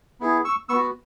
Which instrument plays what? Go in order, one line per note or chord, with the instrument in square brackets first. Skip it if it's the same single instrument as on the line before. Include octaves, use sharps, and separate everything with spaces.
[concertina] B3 E4 G#4
C#6 E6
B3 C#6 E6
F#4